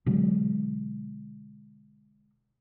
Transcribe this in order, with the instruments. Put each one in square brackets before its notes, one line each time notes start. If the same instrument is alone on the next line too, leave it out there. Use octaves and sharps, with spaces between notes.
[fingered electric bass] B2 D3 F#3 G#3